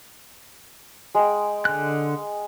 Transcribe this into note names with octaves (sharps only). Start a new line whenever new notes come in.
G#3 G5
D3 F#6